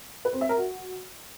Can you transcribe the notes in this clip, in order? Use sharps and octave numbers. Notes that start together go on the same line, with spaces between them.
B4
C4
E5
A#4
F#4